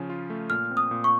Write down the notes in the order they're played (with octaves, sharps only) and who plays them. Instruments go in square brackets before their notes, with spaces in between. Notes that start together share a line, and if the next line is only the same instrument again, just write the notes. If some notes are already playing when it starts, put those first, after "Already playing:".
Already playing: [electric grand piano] C#3 F3 C#4
F4
A3
[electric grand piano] A#2 [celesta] F6
[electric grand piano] C4
[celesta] D#6
[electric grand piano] A#2
[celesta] C#6